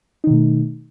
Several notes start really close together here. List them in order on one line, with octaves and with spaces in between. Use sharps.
D#4 D#3 B2 A3